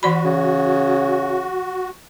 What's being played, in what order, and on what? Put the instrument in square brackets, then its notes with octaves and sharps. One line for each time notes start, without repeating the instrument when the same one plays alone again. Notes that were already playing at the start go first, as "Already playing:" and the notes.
[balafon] E3 D5 B5 [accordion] F#4
[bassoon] C#3